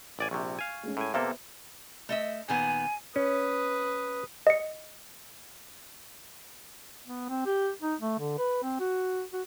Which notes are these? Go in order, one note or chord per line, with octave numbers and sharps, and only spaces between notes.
A1 D5 G#5
A#1 C3 C#6
F5 G#5
G#3 A3 C#4
A2 G#5
C3 A#3 B3 A4 C5 E5
A3 D#5 E5
A#2 D#3 B3 G#5
C#4 B4 D#6
D#5 C#7
B3
C4
G4
D#4
A3
D3
B4
C4
F#4
F#4